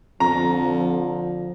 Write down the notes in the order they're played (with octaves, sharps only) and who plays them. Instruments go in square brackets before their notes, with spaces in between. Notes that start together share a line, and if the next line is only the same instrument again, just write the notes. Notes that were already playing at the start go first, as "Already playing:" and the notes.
[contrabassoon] F2 [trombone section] D3 F3 [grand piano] A#5